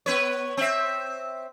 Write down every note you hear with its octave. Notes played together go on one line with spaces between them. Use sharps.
B3 B4 C#5
C4 E5